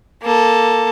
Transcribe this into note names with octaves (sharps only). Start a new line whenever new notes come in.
A#3 A4